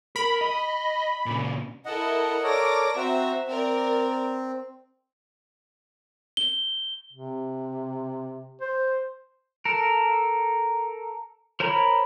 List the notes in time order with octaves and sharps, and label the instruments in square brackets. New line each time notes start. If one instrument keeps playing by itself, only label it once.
[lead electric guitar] A#4 [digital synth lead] B5
[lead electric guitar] D#5
A#2 C#3
[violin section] E4 A4 A#4 [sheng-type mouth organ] D#5 F#5
[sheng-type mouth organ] A4 A#4 C#5 [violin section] D5 D6 A#6
[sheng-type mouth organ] C4 F#4 A#5 [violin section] C5 E5
[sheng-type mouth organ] C4 [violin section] A#4 D5
[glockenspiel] G7
[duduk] C3
C5
[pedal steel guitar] A4 A#4
A#4 C5 C#5 A#5 B5